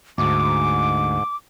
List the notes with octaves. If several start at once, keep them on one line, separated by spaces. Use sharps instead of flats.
D2 G#2 D6